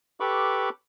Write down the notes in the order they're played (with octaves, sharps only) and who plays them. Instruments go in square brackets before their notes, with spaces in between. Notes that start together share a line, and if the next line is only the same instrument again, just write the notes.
[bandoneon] G4 A4 B4 B5 C#6 D6